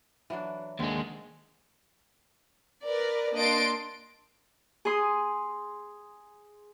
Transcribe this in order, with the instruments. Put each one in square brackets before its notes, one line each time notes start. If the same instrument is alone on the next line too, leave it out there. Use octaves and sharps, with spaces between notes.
[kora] E3 F#3 D4
[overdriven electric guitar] D#2 G#3 [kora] D3 C4
[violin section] A#4 B4 D5
A#3 D4 D#5 C6 A6 D7
[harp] G#4 C6 D#6